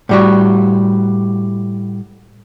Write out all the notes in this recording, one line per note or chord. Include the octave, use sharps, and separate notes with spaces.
A2 G3 F#4